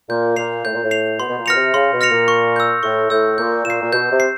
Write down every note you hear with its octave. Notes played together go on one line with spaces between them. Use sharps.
A#2 G6
A#2 C7 F7
A2 G6
A#2
A2
C7 F7
B2 C6
B2
A#2
B2 F6 A#6 C#7 F7
C3
C#3 C6
B2
F6 A#6 C#7 F7
A#2
C#6
E6 G6
A2 C#6
A2 E6 G6
A#2 G6
A#2 C7 E7
A#2
B2 G6
C3
C7